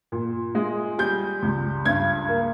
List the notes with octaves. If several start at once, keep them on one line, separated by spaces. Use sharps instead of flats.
A#2
G#3
G3 G6
C#2
G2 G#6
A#3